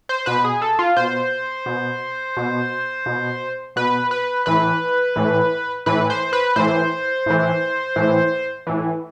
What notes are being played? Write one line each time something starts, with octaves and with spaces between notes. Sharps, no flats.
C5
B2 B4
G#4
A4
F4
B2 C5
B2
B2
B2
B2 B4
B4
A2 E3 B4
A2 E3
A2 E3 B4
C5
B4
A2 E3 C5
A2 E3
A2 E3
A2 E3